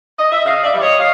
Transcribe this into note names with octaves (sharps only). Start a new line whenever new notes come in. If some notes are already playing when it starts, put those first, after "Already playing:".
D#5
E5
C#3 D#5 F5
D5 E5
E3 G3
C#5 D#5
D#5 F5